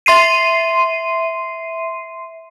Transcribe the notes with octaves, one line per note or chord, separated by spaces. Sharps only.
E5 C6 C7 D#7